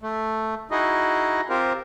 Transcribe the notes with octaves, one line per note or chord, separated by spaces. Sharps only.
A3
D#4 E4 F#4 G#4 D#5
C4 F4 G4 A#4 C5